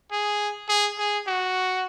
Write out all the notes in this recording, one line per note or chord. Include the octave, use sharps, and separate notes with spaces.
G#4
G#4
G#4
F#4